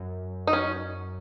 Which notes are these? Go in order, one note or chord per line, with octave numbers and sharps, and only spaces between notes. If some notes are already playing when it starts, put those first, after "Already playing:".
Already playing: F#2
D#4
C#4